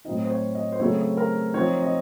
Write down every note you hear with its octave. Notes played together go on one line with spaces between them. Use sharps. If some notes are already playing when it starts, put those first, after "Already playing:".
A2 F#3 C4 D#4 D#5
C5
C#5
D#5
C5
C#3 F#3 A3 C4 C#5
A#4
F3 C4 D#4 C#5
D#5